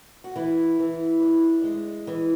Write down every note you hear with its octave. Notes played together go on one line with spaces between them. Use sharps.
F#4
E3 E4
E3
D4
G#3
E3